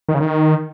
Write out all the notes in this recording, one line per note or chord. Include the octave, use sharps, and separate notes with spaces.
D#3
C#3
D#3